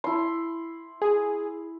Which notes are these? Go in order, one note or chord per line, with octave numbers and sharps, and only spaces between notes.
E4 C6
G#4